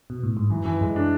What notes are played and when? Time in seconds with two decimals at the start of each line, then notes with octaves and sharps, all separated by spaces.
0.10 B2
0.23 A2
0.37 G#2
0.50 F#2 E3
0.65 F#2 E3
0.81 F#2 G#3
0.96 D4